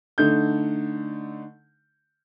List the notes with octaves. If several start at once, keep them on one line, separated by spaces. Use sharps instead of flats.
D3 A3 D#4 G6